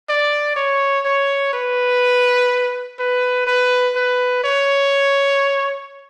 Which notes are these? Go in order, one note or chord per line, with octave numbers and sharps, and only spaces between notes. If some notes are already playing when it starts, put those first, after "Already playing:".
D5
C#5
C#5
B4
B4
B4
B4
C#5